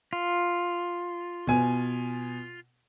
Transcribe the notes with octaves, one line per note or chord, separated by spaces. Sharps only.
F4
B2 G#5